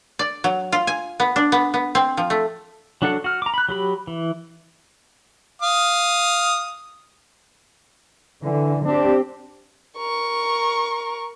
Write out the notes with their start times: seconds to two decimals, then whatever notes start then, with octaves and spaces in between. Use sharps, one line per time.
0.19 D5
0.44 F#3
0.72 F4
0.87 G#5
1.20 B3
1.36 D4
1.52 B3
1.74 B3
1.95 C4
2.17 F3
2.30 A3
3.02 F#3 D4 F#4 A4 F#5
3.24 F#4 F6
3.42 A#5 D6
3.54 B5 F#6
3.69 F#3 G4 B5
4.07 E3
5.62 F5 D#6
8.43 D3 E3
8.85 C4 D4 G4
9.98 A#4 C#6